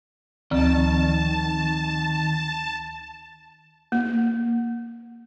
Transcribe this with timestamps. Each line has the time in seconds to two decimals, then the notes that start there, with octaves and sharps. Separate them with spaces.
0.51 D2 D#3 F3 C4 A5
3.92 A#3